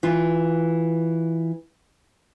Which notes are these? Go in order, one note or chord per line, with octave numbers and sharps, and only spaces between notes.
E3 F4